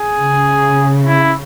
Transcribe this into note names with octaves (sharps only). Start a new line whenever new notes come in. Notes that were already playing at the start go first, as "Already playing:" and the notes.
Already playing: G#4
C#3
E4